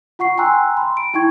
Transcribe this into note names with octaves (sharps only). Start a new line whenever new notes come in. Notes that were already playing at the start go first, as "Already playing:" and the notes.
F4 F#5 C#6 C7
G5 G#5 A#5 C6 E6 F#6
B5 C6
D7
D#4 E4 G5 C#6 G#6